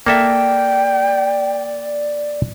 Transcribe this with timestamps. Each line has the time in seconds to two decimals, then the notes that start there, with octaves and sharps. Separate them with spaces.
0.07 A#3 A4 D5 E5 G5